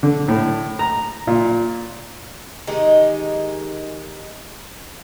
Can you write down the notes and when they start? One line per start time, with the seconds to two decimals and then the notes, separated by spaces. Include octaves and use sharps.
0.03 D3
0.28 A2
0.79 A#5
1.27 A#2
2.67 D#3 G#3 D#4 G4